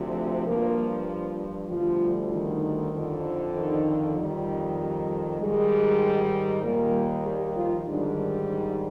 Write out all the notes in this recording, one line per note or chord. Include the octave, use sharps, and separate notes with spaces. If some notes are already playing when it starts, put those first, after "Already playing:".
Already playing: D2 C3 F3
G2 F3 A#3 A#4
D2 D3 F3 G3 F4
D#3 D#4
F2 D3 F3
D#3 D#4
F2 D#3 G3
G3
G#2 D#3 G3 G#3
D#2 A#2 D#3 G3 A#3
G3 G4
F3 F4
G#2 D3 D#3 G3 D4
D#3 D#4